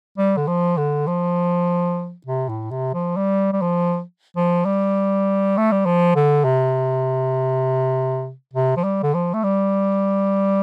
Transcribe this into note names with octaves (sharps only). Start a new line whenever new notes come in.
G3
D3
F3
D3
F3
C3
A2
C3
F3
G3
G3
F3
F3
G3
A3
G3
F3
D3
C3
C3
F3
G3
D3
F3
A3
G3